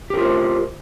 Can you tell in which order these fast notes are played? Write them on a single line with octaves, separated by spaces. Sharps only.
G4 A#4 F4 C5